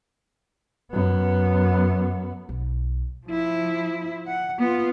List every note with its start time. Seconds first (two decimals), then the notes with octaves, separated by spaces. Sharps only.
0.92 F#2 B3
2.49 B1
3.27 F3 E4
4.27 F#5
4.59 B3 F4